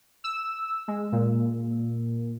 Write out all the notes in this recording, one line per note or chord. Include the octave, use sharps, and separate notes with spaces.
E6
G#3
A#2